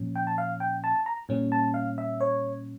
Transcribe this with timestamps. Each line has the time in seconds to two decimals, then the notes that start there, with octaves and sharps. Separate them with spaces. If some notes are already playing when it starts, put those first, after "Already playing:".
Already playing: A#2 F3 C#4
0.16 G5
0.27 A5
0.38 F5
0.60 G5
0.84 A5
1.06 A#5
1.29 A#2 G3 C#4
1.52 A5
1.74 F5
1.98 E5
2.21 C#5